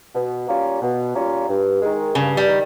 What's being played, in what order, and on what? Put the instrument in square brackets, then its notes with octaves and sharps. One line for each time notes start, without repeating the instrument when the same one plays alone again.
[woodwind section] B2
G3 A#3 C#4 F4
B2
G3 A#3 C#4 F4
G2
D#3 G#3
[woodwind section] G2 [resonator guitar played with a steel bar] C#3
[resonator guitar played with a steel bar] G3
[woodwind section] D#3